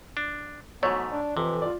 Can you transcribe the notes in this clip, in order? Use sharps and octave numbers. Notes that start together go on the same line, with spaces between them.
D4
G#2 F#3 A3 B3 C#5
D4
F2 C3 E3
F4 D5